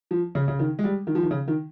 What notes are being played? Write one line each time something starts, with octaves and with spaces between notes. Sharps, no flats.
F3
C#3
C#3
D#3
G#3
G3
D#3
F3
D#3
C#3
D#3